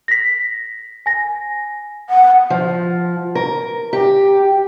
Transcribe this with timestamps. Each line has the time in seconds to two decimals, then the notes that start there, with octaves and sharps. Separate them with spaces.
0.08 A#6 B6
1.06 G#5 A#6
2.10 F#5
2.50 F3
3.35 A#4
3.93 G4